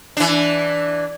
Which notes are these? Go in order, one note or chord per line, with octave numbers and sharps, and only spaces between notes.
E3 D4